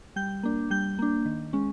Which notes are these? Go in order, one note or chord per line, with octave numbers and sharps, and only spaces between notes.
G3 G6
A#3 D4
G3 G6
A#3 D4
D#3
G#3 C#4